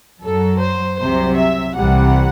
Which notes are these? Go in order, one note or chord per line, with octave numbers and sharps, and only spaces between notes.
F#2 F#3 A4
C5
C2 C3 F#3 C5
E5
C2 C3 E3 G3 F#5